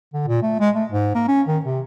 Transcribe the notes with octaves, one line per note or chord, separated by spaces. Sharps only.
D3
A#2
A3
G#3
A3
G#2
A#3
C#4
D#3
C3